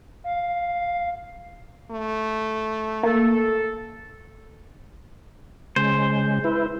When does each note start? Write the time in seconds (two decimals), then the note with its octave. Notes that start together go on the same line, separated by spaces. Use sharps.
0.24 F5
1.91 A3
3.03 A#3 A4
5.76 C#3 G#3 C5
6.44 E4 B4